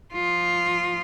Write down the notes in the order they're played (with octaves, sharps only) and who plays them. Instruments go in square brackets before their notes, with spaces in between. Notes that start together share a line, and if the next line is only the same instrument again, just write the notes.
[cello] F3 F4